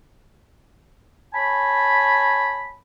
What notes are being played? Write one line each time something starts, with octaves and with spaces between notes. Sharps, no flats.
C#5 G#5 A5 B5